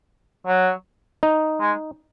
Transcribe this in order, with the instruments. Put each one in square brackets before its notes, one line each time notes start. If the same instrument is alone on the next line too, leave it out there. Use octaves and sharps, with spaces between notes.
[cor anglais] F#3
[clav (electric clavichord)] D#4
[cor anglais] G#3